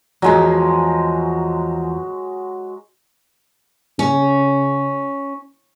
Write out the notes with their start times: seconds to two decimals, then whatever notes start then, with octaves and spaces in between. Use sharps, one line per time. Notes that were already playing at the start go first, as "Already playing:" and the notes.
0.22 E2 G#2 F3 F#3 G#3
3.99 C#3 C#4